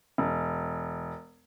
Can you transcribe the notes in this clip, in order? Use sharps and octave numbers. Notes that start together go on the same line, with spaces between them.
E1